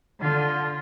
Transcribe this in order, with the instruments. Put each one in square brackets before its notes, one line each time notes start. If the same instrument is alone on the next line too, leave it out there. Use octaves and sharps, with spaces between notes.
[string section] D3 [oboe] F4